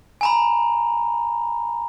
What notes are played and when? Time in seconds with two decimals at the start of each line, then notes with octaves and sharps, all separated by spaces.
0.21 G#5 A#5 B5